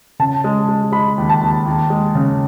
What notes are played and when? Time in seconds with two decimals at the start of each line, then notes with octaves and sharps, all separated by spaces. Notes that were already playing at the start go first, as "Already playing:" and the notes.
0.19 C#3 A5
0.44 G#3
0.68 G#3
0.92 G#3 B5
1.18 D#2
1.29 A5
1.41 D#2
1.66 D#2
1.90 G#3
2.15 C#3